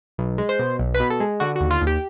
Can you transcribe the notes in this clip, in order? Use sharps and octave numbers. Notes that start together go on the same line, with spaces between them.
B1
G#3
C5
B2
B1
B4
B2
A4
G#3
D3 F#4
F#4
D#2
F4
D#2
G4